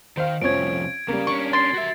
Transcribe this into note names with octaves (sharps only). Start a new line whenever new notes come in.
D#3 C5 F5
C2 F2 F3 C4 C#4 G#6 D7
C#3 G3 A#3
C#4 D4 C#6
C6 A6 C7
F#4 E5